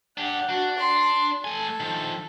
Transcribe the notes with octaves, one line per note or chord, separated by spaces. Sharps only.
D4 G4 F#5
D4 F#4
C6
A3 A4 G#5
D#3 F3